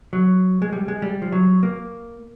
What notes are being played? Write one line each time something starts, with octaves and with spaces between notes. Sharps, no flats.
F#3
G#3
G3
G#3
G3
F3
F#3
A#3